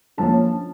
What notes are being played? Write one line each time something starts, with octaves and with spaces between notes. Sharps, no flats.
D3 F3 A#3 C#4 A5